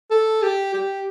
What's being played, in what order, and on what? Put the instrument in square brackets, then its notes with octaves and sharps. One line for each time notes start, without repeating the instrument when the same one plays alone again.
[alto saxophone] A4
G4
G4